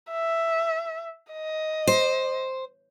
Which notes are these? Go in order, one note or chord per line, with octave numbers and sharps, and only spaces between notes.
E5
D#5
C5